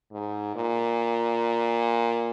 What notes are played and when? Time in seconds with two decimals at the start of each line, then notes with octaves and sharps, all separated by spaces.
0.12 G#2
0.55 A#2